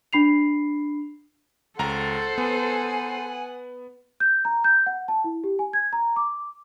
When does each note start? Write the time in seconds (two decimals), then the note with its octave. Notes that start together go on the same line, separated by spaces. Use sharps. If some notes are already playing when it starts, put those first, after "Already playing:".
0.13 D4 B5 C7 F7
1.79 C#2 A4 C5 F#5 A#5 A6
2.38 B3 G#5
4.20 G6
4.45 A#5
4.64 G6
4.86 F#5
5.08 A5
5.24 E4
5.44 G4
5.59 G#5
5.73 G#6
5.93 A#5
6.16 D6